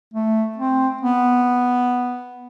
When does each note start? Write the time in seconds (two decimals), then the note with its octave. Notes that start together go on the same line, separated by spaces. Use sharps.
0.14 A3
0.58 C4
1.01 B3